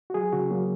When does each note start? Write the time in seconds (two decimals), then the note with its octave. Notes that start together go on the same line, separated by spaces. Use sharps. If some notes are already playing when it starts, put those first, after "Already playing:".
0.10 F#4
0.14 F#3 G#4
0.33 C#3 F#4
0.51 F#3 A#3